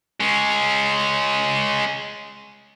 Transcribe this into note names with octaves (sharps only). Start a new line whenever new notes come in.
G#3 C#4